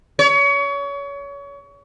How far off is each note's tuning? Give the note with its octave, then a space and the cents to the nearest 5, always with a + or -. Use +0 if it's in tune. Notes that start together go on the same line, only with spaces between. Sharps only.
C#5 +30